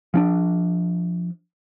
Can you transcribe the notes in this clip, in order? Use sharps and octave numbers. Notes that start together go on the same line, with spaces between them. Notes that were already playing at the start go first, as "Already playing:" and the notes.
F3 C#4 D4